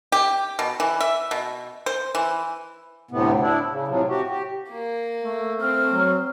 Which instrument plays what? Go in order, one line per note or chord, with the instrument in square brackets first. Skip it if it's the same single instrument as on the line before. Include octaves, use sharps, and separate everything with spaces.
[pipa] G4
B2
E3
E5
B2
C5
E3
[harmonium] D2 A2 C3 B3
D4 E4
C#3
A2 C3 F3 F#3
F#4 G4
G4
[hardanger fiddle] A#3
[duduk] A3
[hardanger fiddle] C4 [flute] F6
[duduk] F#3